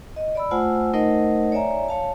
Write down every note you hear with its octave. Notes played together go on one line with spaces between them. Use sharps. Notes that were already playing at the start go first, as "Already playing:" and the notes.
D#5
D5 B5 E6
A3 F4 C5 F#5 G#5 E6
A3 D#4 A#4 C5 D#5 F#5
C#5 D5 E5 G#5 A#5
C#5 F5 A5